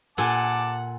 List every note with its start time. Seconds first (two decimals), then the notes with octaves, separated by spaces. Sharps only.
0.18 A#2 A4 F#5 G#5 A5 D6